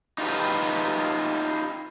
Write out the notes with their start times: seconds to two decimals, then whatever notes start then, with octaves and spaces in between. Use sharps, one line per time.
0.18 D#4 F4 G4 B4